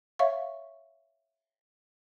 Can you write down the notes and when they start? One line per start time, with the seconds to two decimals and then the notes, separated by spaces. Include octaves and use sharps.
0.19 C#5 E5 F5 C#6